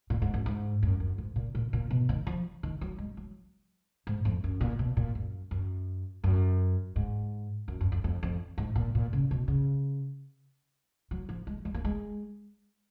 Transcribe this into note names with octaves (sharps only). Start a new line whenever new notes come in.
A#2
G#2
F#2
G#2
F#2
F#2
G#2
A#2
A#2
A#2
B2
D#3
F3
D#3
F#3
G#3
F#3
G#2
F2
F#2
A#2
B2
A#2
F#2
F#2
F#2
G#2
F#2
F#2
F2
F2
F2
G#2
A#2
A#2
C#3
B2
C#3
F#3
F3
G#3
G#3
A#3
G#3